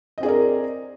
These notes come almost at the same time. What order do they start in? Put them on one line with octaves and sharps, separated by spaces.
D#5 C4 G#4 D5 A#4